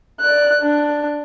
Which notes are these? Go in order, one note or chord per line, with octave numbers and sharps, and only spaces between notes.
D5 F#6
D4